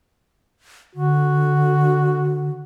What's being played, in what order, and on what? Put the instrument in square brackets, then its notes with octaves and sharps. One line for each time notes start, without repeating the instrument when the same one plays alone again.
[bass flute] D3 [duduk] F#4